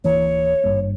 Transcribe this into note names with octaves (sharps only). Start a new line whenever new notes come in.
D1 E3 A#3 C#5
G#1 G2 A#3